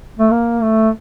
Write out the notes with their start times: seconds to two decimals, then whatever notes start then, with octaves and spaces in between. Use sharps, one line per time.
0.19 A3
0.31 A#3
0.61 A3